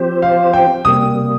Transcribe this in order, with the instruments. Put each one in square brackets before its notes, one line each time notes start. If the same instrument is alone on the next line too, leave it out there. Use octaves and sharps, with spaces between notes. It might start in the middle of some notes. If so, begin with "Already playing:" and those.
Already playing: [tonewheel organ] F3 C4 G4 C5
[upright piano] F5
G5
[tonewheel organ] C3 G3 A#3 [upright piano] D#6